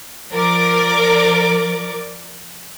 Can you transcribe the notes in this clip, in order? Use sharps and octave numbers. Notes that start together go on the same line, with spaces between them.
F3 A#4 D5 D6